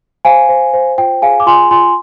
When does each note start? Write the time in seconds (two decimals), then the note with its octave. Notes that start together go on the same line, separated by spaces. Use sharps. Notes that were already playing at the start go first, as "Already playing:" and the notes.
0.25 C5 F5 G#5
0.49 C5
0.73 C5
0.98 F4 G5
1.22 G#4 F5 G#5
1.40 D6
1.47 F4 G#5 C6
1.71 F4 G#5 C6